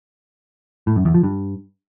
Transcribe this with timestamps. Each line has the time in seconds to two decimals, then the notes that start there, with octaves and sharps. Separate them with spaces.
0.87 A2
0.96 F#2
1.05 E2
1.14 F3
1.23 G2